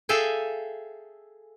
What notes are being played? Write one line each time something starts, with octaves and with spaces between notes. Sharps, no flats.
G#4 A4 E5 F5 G5 G#5